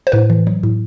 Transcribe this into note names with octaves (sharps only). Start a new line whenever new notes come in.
C5
A2 B4
E3
F#3
A2